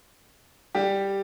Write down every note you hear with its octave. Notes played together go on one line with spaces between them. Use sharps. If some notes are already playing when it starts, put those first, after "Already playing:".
G3 G4